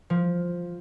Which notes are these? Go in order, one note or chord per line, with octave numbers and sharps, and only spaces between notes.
F3